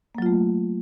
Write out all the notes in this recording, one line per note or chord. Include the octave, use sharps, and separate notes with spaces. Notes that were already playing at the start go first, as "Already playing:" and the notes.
F#3 A3 A#3 F4